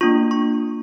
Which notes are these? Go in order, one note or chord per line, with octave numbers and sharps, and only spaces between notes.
A#3 D4 F4 C#6
C#6